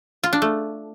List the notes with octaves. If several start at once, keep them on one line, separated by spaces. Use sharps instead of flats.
F4
D4
A3